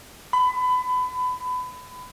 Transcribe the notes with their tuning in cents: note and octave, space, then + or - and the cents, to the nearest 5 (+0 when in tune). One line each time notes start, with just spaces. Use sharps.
B5 +25